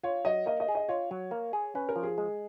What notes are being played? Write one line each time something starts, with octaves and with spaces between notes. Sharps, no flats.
F4 C#5
F#3 D#5
A#3 D#5
D#5
G#4
D#5
F4 C#5
F#3
A#3
G#4
C#4 B4
A#4
F3
G#4
G#3